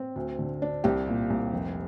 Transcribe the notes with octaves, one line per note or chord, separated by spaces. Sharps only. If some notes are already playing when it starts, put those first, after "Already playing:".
Already playing: C4
D2
D3
D4
C2 G4
A#2
C2
F1